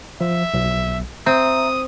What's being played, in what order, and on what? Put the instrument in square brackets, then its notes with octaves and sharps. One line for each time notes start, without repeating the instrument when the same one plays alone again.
[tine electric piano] F3 [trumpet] E5
[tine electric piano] B1
[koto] C4 [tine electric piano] E5 A#5 [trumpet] D#6